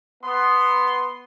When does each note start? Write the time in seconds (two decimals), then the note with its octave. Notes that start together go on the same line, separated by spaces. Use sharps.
0.24 B3 C6